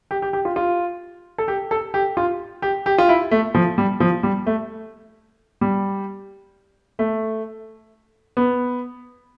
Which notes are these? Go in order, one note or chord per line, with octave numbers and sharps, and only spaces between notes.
G4
G4
G4
F4
F4
A4
G4
A4
G4
F4
G4
G4
F4
E4
A3
F3
G3
F3
G3
A3
G3
A3
B3